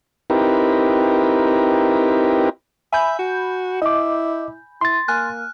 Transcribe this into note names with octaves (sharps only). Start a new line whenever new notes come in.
C4 D#4 E4 G4 A#4 B4
E5 G#5 B5 G6
F#4
E4 D#5 D6
E4 C6 A6
A#3 G#5 F6 F#6